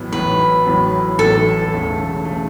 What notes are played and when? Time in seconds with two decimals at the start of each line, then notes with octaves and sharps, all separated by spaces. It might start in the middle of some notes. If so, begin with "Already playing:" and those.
Already playing: A1 A2 F#3 B3
0.12 A1 A2 F#3 B3 B4
0.65 A1 A2 F#3 B3
1.18 A1 A2 F#3 B3 A4
1.71 E1 E2 C#3 A3
2.25 C#3 A3